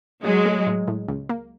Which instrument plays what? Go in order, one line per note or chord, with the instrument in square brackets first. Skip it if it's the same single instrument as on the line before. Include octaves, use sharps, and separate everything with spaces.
[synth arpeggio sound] A2 [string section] F#3 G#3
[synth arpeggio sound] A3
A2
A2
C#2
A#3